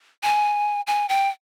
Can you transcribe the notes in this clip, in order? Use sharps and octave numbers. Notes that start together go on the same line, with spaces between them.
G#5
G#5
G5